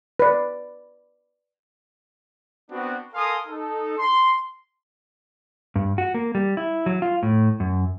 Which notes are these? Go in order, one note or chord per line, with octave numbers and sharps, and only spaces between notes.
B4 D5
B3 C4 D4 F#4
A4 A#4 F5 G#5 C6 D#6
D#4 A4
C6
G2
F#4
A#3
G3
E4
F#3
F4
A2
F#2